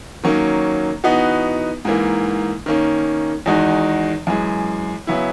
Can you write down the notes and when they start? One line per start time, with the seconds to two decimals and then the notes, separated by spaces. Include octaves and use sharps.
0.24 D#3 F#3 A#3 C#4
1.04 E3 B3 D#4 F#4
1.85 G#2 E3 A#3
2.66 D#3 A#3 C#4
3.46 E2 D#3 G#3 D#4 F#4
4.27 F#2 E3 G#3
5.07 C#3 F#3 B3 E4